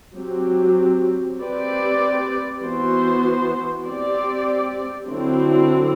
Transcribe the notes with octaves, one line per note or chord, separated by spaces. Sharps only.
F#3 C4 G4
C4 G4 B4 D5
E3 B3 F#4 C5
C4 G4 D5
D3 F#3 C4 E4